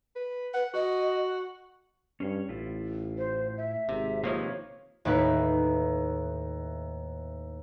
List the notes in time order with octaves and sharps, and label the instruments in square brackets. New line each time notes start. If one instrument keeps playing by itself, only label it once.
[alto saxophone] B4
[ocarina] B4 [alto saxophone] F#5
[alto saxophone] F#4 [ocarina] D#5
[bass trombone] G2 [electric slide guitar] C#4 C5 C#5
[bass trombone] A1 [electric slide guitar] A2 E4 F4
[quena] C5
E5
[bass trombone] G#1 [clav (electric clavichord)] C3
[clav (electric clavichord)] C3 D#3 F3 [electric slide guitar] A#3 B4 F5 [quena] C#5
[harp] D#2 A2 D#4 E4 B4